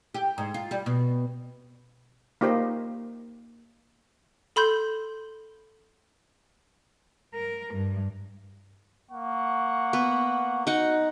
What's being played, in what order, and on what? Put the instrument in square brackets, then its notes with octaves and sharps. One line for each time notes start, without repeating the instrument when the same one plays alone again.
[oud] G4
G#2
F4
G3
B2
[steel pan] A#3 D#4 G4 C5 D#5
[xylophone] A4 B5 C6 G6
[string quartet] A#4
G2
[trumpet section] A#3 F#5 C#6
[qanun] B3
[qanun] D#4 F#5 [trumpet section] F#4